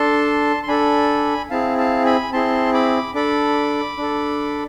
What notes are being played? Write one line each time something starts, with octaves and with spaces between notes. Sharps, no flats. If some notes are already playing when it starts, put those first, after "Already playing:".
Already playing: D4 A4 A5 C6
C6
D4 A4 G#5 B5
C4 E4 G#4 F5 A5
F5 A5
G#5 B5
C4 E4 G#4 A5 C6
B5 D6
D4 A4 B5 D6
D4 A4